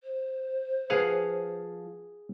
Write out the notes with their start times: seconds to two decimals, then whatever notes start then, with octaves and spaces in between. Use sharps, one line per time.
0.03 C5
0.90 F3 G#4 B4 F5 F#5 G#5